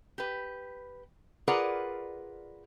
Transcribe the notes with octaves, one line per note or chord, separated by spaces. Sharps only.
G4 B4
F4 G#4 A#4 B4 D5 F#5